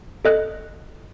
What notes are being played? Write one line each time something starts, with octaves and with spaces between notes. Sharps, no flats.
A4 D#5 F#6